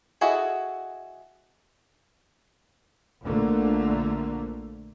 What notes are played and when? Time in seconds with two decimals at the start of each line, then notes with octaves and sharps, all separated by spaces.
0.21 E4 F#4 G#4 A4 D#5
3.23 A#1 D3 A3 A#3